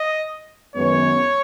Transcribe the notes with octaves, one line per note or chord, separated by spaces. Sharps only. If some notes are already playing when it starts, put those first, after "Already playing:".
Already playing: D#5
F#2 D#3 G#3 B3 C#5